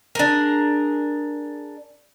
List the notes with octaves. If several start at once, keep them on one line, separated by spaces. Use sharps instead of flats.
D4 G#4 A#4